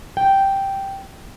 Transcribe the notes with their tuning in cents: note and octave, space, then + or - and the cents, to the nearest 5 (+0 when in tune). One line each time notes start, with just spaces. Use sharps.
G5 -5